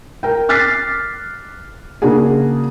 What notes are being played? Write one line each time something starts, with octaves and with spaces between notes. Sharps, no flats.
A#4 G5
D6 F6 F#6 A6 B6 C7
C#3 A#3 D4 F#4 G#4